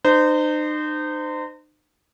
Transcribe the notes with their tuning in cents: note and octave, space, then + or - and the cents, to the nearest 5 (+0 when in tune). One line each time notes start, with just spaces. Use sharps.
D#4 -40 C5 -25